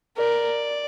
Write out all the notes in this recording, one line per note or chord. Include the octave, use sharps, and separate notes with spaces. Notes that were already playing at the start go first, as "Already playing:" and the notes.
A#4 D5